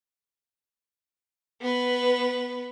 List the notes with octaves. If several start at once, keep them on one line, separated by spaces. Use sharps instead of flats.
B3 B4